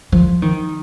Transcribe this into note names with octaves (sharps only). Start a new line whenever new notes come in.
F3
D#3